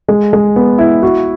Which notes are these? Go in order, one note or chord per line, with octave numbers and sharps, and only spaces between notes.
G#3
G#3
B3
E4
F#4